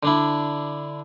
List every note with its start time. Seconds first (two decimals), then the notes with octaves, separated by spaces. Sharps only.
0.03 D3 D4 E4